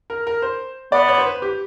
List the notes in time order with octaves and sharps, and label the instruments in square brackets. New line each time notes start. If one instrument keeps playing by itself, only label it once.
[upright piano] A#4
A#4
C5
[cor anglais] B3 [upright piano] D5
[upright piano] C#5
C5
B4
G4